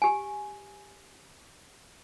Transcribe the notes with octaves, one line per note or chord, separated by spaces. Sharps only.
G4 G#5